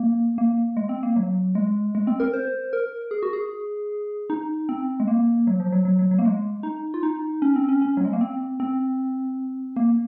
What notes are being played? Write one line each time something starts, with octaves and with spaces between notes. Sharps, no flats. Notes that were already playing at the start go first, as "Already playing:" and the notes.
Already playing: A#3
A#3
G#3
C4
A#3
F#3
G#3
G#3
C4
A#4
C5
A#4
G#4
F#4
G#4
D#4
C4
G#3
A#3
F#3
F3
F#3
F#3
F#3
F#3
A#3
G#3
D#4
F4
D#4
C#4
C4
C#4
C#4
F#3
G#3
A#3
C4
C4
A#3